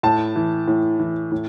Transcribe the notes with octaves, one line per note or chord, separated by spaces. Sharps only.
A2 A5
E3
A2
E3
A2